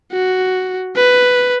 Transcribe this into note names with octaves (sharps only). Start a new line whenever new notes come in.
F#4
B4